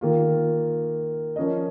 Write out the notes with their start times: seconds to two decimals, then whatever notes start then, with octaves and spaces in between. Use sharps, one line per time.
0.01 D#3 A#3 F4
1.36 F3 C#4 A#4 D#5